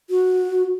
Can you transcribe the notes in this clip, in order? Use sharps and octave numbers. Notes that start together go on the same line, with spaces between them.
F#4